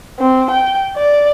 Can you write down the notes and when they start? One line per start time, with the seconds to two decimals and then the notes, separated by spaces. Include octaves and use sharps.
0.19 C4
0.51 G5
0.97 D5